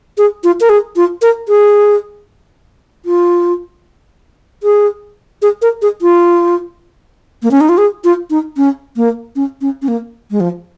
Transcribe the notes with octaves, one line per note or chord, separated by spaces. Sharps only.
G#4
F4
A#4
G#4
F4
A#4
G#4
F4
G#4
G#4
A#4
G#4
F4
A#3
C#4
D#4
F4
G#4
F4
D#4
C#4
A#3
C#4
C#4
C#4
A#3
G#3
F3